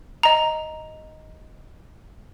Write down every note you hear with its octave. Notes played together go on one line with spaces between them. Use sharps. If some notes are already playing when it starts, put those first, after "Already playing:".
D#5 A#5